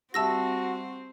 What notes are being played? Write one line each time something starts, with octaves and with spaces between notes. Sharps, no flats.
G3 C4 F#4 E5 A5 E6 A#6